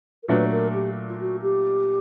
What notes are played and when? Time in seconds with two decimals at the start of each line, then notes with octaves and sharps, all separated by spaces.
0.23 A#4
0.28 A#2 F#3 A3 D4 B4
0.51 A#4
0.73 G4
1.09 F4
1.20 F#4
1.42 G4